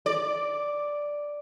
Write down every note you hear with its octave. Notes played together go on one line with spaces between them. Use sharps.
D5